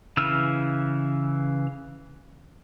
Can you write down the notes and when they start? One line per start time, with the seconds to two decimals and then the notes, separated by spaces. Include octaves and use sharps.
0.17 C#3 E3 E6 F6